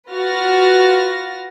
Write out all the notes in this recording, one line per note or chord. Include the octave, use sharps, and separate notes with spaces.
F4 F#4 B4 F6 A6 A#6